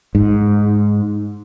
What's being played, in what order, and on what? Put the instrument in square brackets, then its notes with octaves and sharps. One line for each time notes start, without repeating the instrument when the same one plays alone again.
[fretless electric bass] G#2